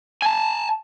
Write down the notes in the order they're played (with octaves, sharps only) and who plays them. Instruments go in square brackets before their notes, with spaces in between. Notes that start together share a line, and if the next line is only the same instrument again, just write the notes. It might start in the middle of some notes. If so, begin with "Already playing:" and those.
[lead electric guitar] G#5 A5